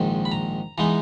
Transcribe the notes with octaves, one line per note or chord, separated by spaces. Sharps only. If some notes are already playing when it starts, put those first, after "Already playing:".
Already playing: A#1 G#2 D#3
B5
A#5
E3 G#3 B3 D#4 A#5